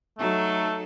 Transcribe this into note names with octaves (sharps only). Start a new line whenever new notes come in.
F#3 A3 D#4 A4